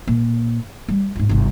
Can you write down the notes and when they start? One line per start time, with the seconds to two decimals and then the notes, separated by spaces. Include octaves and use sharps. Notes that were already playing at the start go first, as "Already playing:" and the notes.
0.07 A#2
0.88 G3
1.15 G#2 F4
1.29 G1 C2